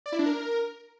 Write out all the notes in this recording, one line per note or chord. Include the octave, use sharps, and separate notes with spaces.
D5
E4
D4
A#4